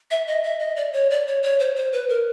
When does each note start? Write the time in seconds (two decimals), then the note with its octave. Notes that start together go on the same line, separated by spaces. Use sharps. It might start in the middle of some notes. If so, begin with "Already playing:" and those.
0.11 E5
0.27 D#5
0.43 E5
0.60 D#5
0.76 D5
0.93 C#5
1.10 D5
1.27 C#5
1.43 C#5
1.59 C5
1.76 C5
1.92 B4
2.09 A#4